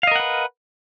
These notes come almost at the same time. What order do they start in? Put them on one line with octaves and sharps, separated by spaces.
F5 D#5 A#4 F#5 B4